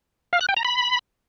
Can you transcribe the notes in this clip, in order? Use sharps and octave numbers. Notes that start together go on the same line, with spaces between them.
F5
F#6
G5
A#5
B5